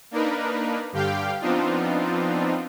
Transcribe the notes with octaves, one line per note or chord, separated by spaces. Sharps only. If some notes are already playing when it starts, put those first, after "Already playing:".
A#3 D4 D#4 A#4 B4
G2 D3 G4 F5 G5
F3 B3 C4 D4 D#4 F4